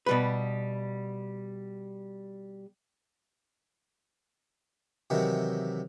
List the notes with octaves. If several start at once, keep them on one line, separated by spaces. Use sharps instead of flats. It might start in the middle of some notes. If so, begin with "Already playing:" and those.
B2 G3 B4
C3 D#3 E3 F#3